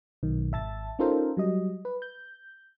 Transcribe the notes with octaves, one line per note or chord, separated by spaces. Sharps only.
B1 D#3
G#1 E5 A5 A6
C#4 D#4 F4 A4 A#4 C5
F#3 G3 D#5
B4
G6